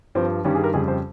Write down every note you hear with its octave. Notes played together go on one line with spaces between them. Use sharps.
G2 F3 C4
G2 D#3 G3 C#4
G#4
A#4
F2 C#3 G3 G#4
C5